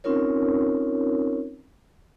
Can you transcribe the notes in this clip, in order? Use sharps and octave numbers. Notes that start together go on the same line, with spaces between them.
C4 C#4 D#4 F4 A#4 C#5